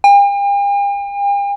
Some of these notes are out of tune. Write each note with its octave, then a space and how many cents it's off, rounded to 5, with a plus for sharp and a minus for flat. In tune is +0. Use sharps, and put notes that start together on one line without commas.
G5 +45